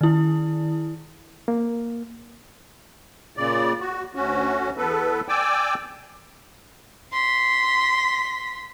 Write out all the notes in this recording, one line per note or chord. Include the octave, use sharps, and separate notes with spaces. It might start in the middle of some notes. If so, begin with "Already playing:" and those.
D#3 E4
A#3
A#2 C#3 D5
F#4
D2 C#4 F#4
E2 B3 A4 B4
D5 G5 G#5 D6 E6
C6 B6